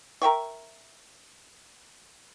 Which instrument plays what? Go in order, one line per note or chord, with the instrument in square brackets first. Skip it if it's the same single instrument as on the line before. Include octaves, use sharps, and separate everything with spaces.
[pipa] A#4 E5 G5 C#6